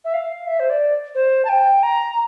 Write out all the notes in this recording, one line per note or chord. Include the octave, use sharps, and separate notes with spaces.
E5
F5
E5
C5
D5
C5
A5
G5
A#5